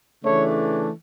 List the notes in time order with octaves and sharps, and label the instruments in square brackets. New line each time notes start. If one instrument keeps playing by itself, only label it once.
[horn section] C#3 E3 A3 D4 C#5